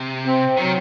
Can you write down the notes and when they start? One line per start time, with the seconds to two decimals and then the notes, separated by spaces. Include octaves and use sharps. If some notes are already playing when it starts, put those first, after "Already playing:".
Already playing: C3
0.25 C4
0.57 D#3 F#3